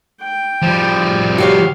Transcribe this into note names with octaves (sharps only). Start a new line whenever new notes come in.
G5
F3 G3
F#4 G4 C#5 F5